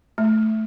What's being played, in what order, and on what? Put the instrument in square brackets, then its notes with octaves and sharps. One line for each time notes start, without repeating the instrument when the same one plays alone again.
[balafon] A3